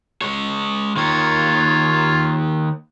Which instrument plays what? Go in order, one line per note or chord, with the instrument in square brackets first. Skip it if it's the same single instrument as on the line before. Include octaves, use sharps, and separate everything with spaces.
[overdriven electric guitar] G#3 C#5
[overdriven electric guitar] D#3 A#3 [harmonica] F4 C#5